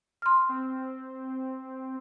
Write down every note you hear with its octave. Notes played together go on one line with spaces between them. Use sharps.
C6 F6
C4